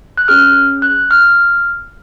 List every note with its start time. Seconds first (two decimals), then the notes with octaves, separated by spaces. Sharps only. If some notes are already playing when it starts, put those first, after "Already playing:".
0.17 F#6
0.28 C#4 G#4 F6
0.82 F#6
1.11 F6